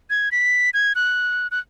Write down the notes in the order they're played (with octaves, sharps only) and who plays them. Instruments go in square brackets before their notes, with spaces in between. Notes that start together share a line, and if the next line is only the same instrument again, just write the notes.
[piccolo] G#6
B6
G#6
F#6
F#6